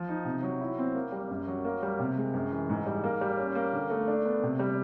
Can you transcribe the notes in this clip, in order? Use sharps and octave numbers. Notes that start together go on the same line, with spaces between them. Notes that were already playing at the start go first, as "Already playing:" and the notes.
Already playing: F3
D#4
C3
F#3
E4
C4
A#3
G3
F#2
F#3
A#3
G3
C3
G#3
F#2
E3
G#2
G3
A#3
G3
C#4
A#3
D3
A3
D4
B3
C3
G3